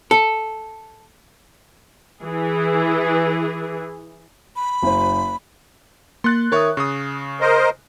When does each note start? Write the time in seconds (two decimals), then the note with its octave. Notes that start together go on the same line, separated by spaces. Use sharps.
0.11 A4
2.23 E3 G#4
4.56 B5
4.83 F#1 C5
6.24 A#3 C6 F#6 A6
6.52 D#3 A#4 C#5 E5 C#6 D#6
6.77 C#3 C#6 D#6
7.41 A#4 C5 D#5